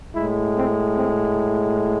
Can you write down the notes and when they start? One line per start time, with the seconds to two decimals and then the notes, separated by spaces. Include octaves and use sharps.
0.15 A2 G#3 E4
0.56 C4
0.97 C4